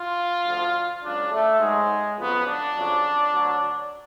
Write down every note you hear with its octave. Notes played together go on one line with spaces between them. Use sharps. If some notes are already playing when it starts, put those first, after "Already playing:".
Already playing: F4
D2 D3 F3
C#2 C#3 F#3 D4
A3
G#2 F#3 G#3
F2 C#3 F#3 B3
D4
F2 C#3 F#3
D2 D3 F#3